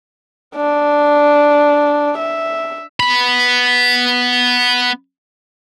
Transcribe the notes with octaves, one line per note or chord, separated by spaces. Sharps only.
D4
E5
B3 B5